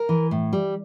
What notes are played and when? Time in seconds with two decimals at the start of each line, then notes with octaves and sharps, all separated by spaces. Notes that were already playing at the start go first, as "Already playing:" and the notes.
Already playing: A#4
0.09 E3
0.31 A2
0.53 G3